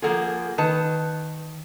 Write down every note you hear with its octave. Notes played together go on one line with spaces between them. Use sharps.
F3 A#3 F4 G#4 A4 F#5
D#3 B4 A5